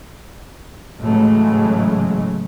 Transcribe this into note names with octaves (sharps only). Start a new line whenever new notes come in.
A2 C#3 E3 F#3 G#3 A3